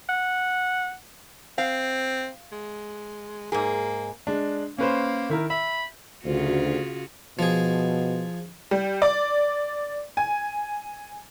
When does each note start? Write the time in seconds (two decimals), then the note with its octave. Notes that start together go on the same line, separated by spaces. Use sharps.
0.09 F#5
1.58 C4 F5
2.52 G#3
3.52 G#2 A#3 G#4
4.27 G#3 D4
4.78 A#3 C#4 B4 C5
5.29 D#3 E4 A#4
5.50 E5 B5
6.25 D2 C#3 F4 F#4
7.39 B2 F3 G#4
8.71 G3
9.02 D5
10.17 G#5